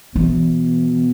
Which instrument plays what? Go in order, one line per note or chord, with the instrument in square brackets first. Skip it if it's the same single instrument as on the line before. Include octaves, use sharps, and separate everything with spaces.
[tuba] B2 [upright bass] E3